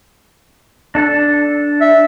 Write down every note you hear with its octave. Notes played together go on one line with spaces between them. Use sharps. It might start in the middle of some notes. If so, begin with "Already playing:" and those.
D4 A4
E5